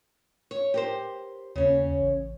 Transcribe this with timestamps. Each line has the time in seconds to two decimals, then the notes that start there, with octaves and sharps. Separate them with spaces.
0.51 C#5
0.74 G4 A#4 C5
1.56 D#2 C#3 C#4
2.00 A1